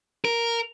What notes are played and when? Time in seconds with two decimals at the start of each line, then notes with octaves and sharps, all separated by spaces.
0.25 A#4